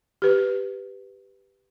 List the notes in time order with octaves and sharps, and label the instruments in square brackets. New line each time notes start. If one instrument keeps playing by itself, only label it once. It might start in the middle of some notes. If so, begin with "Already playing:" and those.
[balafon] G4 B4